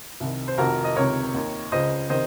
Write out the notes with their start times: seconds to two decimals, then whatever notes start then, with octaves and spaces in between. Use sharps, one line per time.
0.20 C2 C3 D#3
0.48 C5
0.58 F1 F2 D#3 F#4 A#4
0.84 D#5
0.96 C#2 C3 D#3 A#4 C#5
1.34 D#2 D#3
1.72 C#2 C#3 C5 D#5
2.10 C3 D#3 C5 D#5